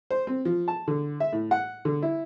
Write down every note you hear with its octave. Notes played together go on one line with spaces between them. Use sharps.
C5
C4
F3
A5
D3
E5
A2
F#5
D3
E4